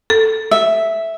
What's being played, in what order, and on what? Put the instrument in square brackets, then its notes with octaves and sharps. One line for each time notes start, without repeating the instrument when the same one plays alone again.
[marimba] A4
[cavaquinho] E5